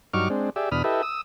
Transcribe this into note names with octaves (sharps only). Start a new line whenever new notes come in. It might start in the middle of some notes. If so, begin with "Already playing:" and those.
G2 F#3 D#4 C#6 D6 F6
G#3 C4 D4
G4 G#4 D5 E5
E2 B2 D4 B5 D#6 F6
E4 G4 A4 B4 D#5 E5
D#6 E6